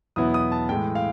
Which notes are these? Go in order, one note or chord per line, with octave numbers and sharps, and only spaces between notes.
E2 B2 F#3 B3 E4 D#6
D#6
A5
A2 E3 G#3 G5
F5